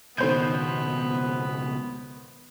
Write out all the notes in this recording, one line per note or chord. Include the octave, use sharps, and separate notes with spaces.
C#2 B2 D#3 B3 C5 G6